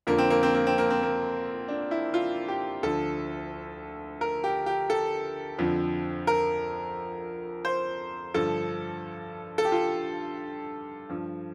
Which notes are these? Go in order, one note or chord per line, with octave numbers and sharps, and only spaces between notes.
F2 D3 F3 A#3
C4
A#3
C4
A#3
C4
A#3
C4
A#3
D4
E4
F4
G4
D2 D3 F3 A4
A#4
G4
G4
A4
F2 D3 F3
A#4
C5
G2 D3 F3 A4
A4
G4
F4
G2 F3